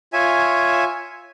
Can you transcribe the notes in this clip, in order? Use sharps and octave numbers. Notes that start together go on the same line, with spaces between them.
F4 C#5 E5 G#5